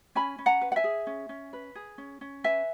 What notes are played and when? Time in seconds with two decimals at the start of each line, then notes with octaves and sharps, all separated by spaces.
0.15 C#4 G#5 B5
0.38 C#4
0.46 F#5 A#5
0.61 B4
0.72 F#5
0.76 E5 G#5
0.84 G#4
1.07 C#4
1.29 C#4
1.53 B4
1.75 G#4
1.98 C#4
2.21 C#4
2.44 B4 E5 G#5